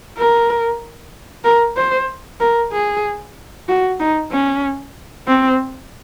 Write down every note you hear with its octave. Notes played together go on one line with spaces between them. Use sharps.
A#4
A#4
C5
A#4
G#4
F#4
D#4
C#4
C4